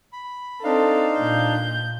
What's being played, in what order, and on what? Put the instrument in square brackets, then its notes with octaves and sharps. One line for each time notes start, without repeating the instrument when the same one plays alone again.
[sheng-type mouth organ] B5
[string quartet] C4 A4 [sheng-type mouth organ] D4 D#4 F5
[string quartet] A#2 G6